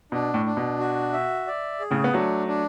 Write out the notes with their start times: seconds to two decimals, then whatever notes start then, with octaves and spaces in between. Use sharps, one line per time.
0.12 B2 D4
0.34 A2
0.46 D4
0.57 B2
0.79 F#4
1.13 E5
1.47 D5
1.80 G#4
1.91 A2 C#3
2.04 B3
2.13 F#3 A3 D4
2.47 D4